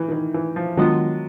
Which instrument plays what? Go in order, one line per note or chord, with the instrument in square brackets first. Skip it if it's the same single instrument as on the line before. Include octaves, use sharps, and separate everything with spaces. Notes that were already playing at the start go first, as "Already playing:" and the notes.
Already playing: [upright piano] E3
D#3
E3
E3
F3
[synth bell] D#3 G#3 B3 D4 F4 [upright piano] F#3